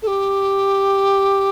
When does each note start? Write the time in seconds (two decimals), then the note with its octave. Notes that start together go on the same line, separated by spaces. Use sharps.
0.02 A4
0.07 G4